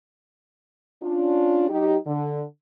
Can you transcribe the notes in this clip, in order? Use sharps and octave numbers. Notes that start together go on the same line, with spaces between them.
C#4 D4 F4
F#3 D#4 G4
D3